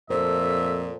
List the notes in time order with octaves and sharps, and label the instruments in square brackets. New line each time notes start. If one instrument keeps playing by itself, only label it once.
[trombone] F2 [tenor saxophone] A#2 [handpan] A4 C5 [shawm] E5